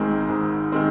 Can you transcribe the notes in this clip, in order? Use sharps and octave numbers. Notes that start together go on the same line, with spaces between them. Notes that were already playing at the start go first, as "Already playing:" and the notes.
Already playing: G#1 G#2 D#3 G#3 C4
G#1
D#3 G#3 C4